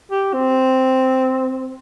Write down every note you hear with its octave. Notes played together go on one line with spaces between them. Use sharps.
G4
C4